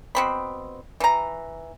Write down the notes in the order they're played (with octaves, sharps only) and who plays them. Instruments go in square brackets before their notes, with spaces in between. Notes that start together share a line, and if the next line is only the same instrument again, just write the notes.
[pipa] B2 C4 B5
E3 A#5